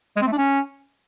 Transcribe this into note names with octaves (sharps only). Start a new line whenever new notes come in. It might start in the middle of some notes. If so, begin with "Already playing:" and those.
G#3
C4
A3
D4
C#4